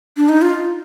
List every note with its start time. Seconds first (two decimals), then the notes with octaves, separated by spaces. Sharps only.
0.17 D4
0.29 D#4
0.42 F4